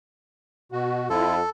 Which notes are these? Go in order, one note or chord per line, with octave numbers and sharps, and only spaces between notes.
B2 F#4
F2 E4 F4 A4